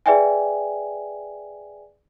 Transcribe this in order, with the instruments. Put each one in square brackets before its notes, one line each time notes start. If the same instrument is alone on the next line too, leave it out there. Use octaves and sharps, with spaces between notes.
[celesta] G#4 B4 D5 E5 G5 G#5